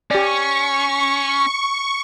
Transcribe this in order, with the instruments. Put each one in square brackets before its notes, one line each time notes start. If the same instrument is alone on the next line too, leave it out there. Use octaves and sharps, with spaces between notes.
[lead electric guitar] C#4 [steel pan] G4 D5 [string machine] C#6